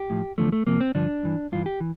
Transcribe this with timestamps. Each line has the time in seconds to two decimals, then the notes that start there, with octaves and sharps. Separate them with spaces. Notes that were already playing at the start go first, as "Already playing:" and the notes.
Already playing: G4
0.10 A2 F3
0.38 E2 D3 F3 A3
0.52 A3
0.66 F2 C3 F3 A#3
0.81 C4
0.95 G2 D3 F3 D4
1.23 G2 E3
1.52 G2 E3 F4
1.66 G4
1.80 E3